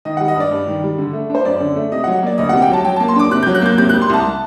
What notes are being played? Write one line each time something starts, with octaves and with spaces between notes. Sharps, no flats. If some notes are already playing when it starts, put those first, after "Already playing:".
D#3 D#5
G3 F#5
D#5
G2 D5
G2
D#3
G3
D3
A3
D4 C5
F#2 D5
D3
A3
C3 D#5
F#3 F#5
A#3 D5
D2 D#5
C3 F#5
G5
F#3 A5
F#3 G5
A#3 A5
C6
D4 D6
C3 F#6
F#3 G6
F#6
A#3 G6
C3 G6
G3 F#6
C6
C2 A5